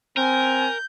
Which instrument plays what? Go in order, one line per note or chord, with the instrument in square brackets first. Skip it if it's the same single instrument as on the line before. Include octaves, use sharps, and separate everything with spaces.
[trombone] C4 [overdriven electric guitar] A#4 [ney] G#5 [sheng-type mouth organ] G6